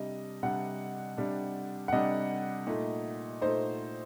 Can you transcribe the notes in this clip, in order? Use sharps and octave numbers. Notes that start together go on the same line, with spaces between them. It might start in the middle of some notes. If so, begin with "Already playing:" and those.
Already playing: C3 G3 D4 D#5
C3 G3 D4 F#5
C3 G3 D4
F#5
C3 G3 D4 D#5
A#2 A3 D#4
A#2 A3 D#4 C5